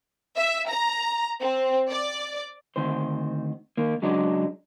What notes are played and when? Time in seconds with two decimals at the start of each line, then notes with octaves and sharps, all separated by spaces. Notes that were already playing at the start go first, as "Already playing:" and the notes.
0.37 E5
0.70 A#5
1.41 C4
1.90 D5
2.76 D2 D#3 C4 C5
3.77 D#3 A#3
4.02 C#3 F#3 G#3 D4 D#4